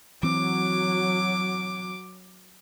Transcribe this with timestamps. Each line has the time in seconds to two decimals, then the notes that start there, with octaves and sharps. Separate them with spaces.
0.23 E3 F#3 C4 D6